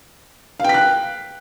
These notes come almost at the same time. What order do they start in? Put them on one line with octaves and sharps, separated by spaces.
F5 G5 B6 F#6